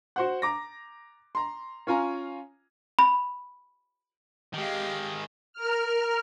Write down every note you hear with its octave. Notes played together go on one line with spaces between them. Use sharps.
F#4 C5 F#5
A#5 D6 A#6
A#5 C6
C#4 F4 G#5 A#5
B5
D#3 G#3 G4 F5
A#4 F6